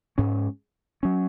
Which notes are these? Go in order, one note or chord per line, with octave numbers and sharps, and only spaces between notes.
G#2 G#3 C#4
F#3 C#4